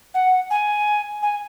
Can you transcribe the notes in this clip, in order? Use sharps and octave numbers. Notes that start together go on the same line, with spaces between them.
F#5
G#5
G#5